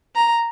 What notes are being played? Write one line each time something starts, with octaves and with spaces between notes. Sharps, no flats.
A#5